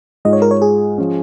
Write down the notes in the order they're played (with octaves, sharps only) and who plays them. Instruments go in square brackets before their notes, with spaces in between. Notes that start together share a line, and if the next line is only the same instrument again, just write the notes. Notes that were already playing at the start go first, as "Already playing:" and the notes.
[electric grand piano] G#2 G#3 F4 [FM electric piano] D#5
[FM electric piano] C#5
A#4
C#5
G#4
[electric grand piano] F3 C#4